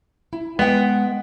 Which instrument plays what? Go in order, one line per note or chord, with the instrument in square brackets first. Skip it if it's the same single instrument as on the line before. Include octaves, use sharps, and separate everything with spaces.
[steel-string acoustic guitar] E4
[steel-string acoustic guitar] G#3 F#5 G5 [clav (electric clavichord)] B3